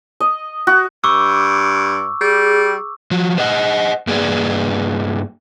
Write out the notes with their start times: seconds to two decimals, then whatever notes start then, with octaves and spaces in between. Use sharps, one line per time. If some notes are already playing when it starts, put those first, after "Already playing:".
0.20 D#5
0.67 F#4
1.04 G2 C#6 D6 E6
2.21 G3 G#4
3.11 F3 F#4
3.38 C5 D#5 F#5
4.07 G2 A#3 G#4 B4 D5